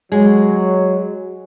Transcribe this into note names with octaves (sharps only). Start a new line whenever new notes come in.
F#3 G#3